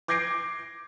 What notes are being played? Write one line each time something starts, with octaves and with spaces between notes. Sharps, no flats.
D6 G6 G#6 A#6 C7 D7